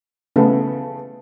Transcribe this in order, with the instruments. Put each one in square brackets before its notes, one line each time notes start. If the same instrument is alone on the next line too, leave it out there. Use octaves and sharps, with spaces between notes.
[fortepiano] C#3 A3 [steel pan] B3